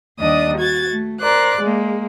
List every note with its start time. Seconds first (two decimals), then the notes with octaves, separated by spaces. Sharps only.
0.20 D#2 G3 D4 D#5 D#6
0.57 F#4 G#6 A6
0.89 A3
1.21 A#4 C5 D5 F#6
1.60 G#3 A#3